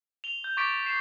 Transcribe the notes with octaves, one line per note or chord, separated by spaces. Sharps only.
F7 G7
G6
C#6 D6 A6 B6 D7
A6
C7 E7